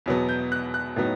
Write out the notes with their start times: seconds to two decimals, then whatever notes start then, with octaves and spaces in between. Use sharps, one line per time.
0.06 E2 B2 F#3 B3
0.29 G6
0.52 F#6
0.74 F#6
0.96 A2 F#3 B3 D#4